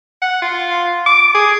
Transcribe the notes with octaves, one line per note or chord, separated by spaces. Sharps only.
F#5
F4
D6
G#4